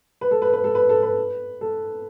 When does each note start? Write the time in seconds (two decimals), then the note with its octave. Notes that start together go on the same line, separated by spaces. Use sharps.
0.21 B4
0.31 A4
0.42 B4
0.53 B4
0.64 A4
0.75 B4
0.89 A4
1.03 B4
1.61 A4